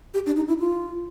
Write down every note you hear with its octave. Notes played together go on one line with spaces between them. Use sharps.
G4
D4
D#4
E4
F4